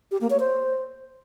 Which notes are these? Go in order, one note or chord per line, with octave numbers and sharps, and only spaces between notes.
G4
A#3
C#5
C5